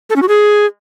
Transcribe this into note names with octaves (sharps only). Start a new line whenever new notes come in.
A4
C#4
F#4
G#4